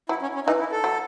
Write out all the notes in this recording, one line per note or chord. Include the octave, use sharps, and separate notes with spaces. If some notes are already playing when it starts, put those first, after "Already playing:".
F#3 E4
C#4
C#4
E3 D#4
E4
A4
F#3